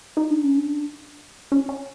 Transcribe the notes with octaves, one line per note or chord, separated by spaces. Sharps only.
D#4
D4
C#4
D4
C#4
C#4